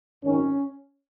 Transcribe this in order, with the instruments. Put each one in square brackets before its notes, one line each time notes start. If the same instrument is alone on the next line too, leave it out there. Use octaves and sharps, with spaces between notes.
[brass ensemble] G#1 F#2 D#3 C#4